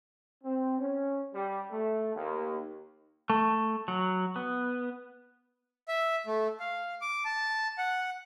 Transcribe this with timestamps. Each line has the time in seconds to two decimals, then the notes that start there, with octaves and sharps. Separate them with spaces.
0.44 C4
0.79 C#4
1.34 G3
1.71 A3
2.15 D#2
3.30 A3
3.88 F#3
4.36 B3
5.88 E5
6.27 A3
6.60 F5
7.01 D6
7.25 A5
7.78 F#5